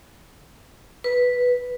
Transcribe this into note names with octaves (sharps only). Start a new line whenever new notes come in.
B4